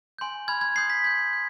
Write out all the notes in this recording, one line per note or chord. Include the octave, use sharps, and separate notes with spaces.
G#5 C6 G6
G#5 B5 F6 G#6
G#6
C6 D#6 G6 C7
B6
C6 G6 G#6
G6